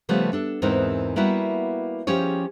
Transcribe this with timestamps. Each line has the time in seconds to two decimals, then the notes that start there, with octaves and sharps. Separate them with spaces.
0.09 C#3 F3 G3 A3 B3
0.33 D4 A4
0.62 E2 G#2 E3 C4 D#4 A#4
1.16 G3 A#3 B3 E4 F#4
2.07 F3 C#4 G4 G#4 C#5